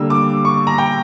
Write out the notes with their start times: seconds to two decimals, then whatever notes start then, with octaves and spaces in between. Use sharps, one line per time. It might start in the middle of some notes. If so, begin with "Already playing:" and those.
Already playing: D3 G3 A#3 E6
0.10 D6
0.45 C#6
0.67 A#5
0.78 G5